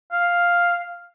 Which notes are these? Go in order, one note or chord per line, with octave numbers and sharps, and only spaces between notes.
F5